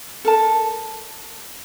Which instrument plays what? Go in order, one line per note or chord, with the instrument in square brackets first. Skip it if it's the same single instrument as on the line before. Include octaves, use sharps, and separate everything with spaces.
[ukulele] A4 A#4 A5